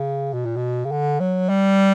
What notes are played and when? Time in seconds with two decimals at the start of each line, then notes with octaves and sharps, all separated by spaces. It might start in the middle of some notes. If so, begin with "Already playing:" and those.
Already playing: C#3
0.33 B2
0.45 A#2
0.57 B2
0.85 C#3
0.92 D3
1.20 F#3
1.49 G3